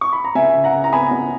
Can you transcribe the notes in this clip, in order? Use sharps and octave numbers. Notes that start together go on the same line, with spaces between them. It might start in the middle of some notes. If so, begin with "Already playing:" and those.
C#6
B5
A#5
C#2 E5 G#5
C#3
F#5 A#5
C#3
A#5
B3 G#5 B5
C#2